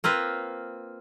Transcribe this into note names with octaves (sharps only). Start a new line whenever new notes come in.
A#3 C4 F4 B4